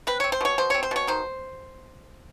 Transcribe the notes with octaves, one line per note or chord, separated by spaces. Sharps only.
C4 B4
C4 C#5
C5
B2 C#5
B2 C5
C4 C#5
C5
B2 C#5
D#3 C5